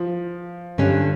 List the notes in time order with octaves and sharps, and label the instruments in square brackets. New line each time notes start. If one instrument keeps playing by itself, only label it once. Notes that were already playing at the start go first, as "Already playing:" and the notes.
Already playing: [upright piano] F3
[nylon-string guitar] G2 D3 G3 C#4